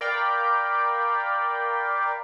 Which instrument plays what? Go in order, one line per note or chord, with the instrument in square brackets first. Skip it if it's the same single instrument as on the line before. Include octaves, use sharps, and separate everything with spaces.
[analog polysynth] A#4 D5 F5 G5 B5